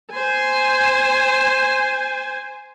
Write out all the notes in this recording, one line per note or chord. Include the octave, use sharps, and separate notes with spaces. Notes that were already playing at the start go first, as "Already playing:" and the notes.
C5 G#5